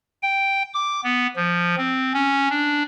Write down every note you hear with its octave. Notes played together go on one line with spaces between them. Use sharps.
G5
D6
B3
F3
C4
C#4
D4